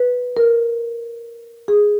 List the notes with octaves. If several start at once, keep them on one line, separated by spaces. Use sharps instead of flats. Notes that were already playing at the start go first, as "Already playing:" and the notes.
Already playing: B4
A#4
G#4